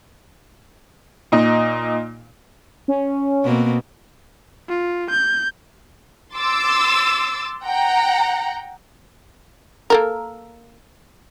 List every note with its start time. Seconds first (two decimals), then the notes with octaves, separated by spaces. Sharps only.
1.32 A#2 D#4
2.88 C#4
3.44 B2 A#3 C4
4.69 F4
5.10 G6
6.34 C6 D6 E6 A6
7.65 F#5 G5 A#5
9.90 A#3 A4 A#4